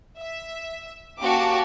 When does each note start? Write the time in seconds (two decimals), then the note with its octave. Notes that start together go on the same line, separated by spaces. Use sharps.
0.20 E5
1.19 A#3 C#4 F#4 G4 A5 D6